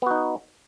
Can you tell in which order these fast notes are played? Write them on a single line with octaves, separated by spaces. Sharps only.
B3 F#4 D#4